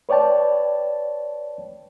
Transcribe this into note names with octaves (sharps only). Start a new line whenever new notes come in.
B4 C#5 D5 G5 A5